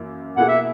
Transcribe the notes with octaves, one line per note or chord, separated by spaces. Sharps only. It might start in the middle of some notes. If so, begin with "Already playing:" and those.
Already playing: F#2 E3 A#3
B2 A#3 E4 G#4 F#5
E5